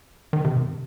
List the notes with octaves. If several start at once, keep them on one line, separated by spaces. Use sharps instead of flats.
D#3
C3
G2